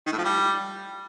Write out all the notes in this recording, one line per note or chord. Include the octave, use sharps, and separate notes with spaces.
D#3
A2
F3
G3